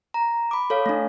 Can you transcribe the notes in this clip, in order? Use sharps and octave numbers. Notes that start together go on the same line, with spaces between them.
A#5
B5 D6
A4 C#5 F5
A3 D4